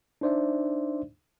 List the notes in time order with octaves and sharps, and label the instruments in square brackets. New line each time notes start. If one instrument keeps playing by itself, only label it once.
[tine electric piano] D4 D#4 C5 D5 E5